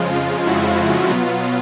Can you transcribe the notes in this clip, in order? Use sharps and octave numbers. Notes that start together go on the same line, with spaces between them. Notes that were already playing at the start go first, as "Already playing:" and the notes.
Already playing: F2 C#3 F3 G#3 F4
F4
E4 F#4
E4 F#4
B2 F#3 B3 F4